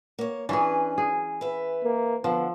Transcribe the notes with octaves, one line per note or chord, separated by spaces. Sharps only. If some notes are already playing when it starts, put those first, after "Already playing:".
A#3 C#5
E3 C#4 D4 G#4 B4
G#4
B4 E5
A#3
D3 F3 B3